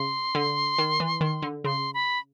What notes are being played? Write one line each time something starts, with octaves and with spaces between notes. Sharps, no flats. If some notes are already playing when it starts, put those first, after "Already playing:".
Already playing: C#3 C6
D3
D#3
E3
D#3
D3
C#3 C6
B5